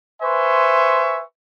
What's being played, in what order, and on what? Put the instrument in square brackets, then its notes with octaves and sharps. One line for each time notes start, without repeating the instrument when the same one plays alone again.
[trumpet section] B4 C5 E5 G#5 C6 C#6